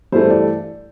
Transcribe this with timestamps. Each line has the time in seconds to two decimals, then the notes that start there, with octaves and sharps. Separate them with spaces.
0.12 G2 E3 A3 C5
0.30 D5